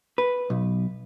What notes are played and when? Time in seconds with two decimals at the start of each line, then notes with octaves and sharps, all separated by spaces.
0.18 B4
0.50 B1